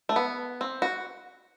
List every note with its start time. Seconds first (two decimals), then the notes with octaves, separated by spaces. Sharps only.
0.09 A3
0.16 B3
0.61 C4
0.82 F#4